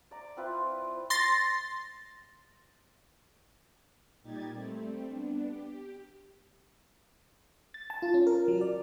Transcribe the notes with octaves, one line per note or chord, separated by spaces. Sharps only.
D5 A#5
C4 E4 F4 B4
C6 A6 A#6
A#2 G3 D#4 G4 G#6 A6
G3 A3 C4
B3 D4
G4
A6
A5
F4
C#4
A#4
F#3
D5